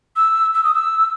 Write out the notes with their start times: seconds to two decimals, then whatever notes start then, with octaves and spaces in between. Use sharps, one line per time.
0.16 E6
0.54 E6
0.64 D#6
0.74 E6